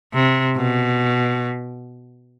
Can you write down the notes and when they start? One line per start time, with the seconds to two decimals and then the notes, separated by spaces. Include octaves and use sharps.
0.14 C3
0.56 B2